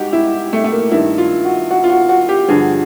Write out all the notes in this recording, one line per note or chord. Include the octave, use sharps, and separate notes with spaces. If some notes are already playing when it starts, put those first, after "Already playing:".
Already playing: G#2 F#4 G4
E4
A3
A3
A#3
G2 D#3 E4
F4
F#4
F#4
F4
F#4
F#4
G4
G2 D3 F3 G#4